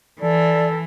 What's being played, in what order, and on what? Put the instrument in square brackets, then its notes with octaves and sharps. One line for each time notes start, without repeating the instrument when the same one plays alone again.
[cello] E3 [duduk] A4 [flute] D5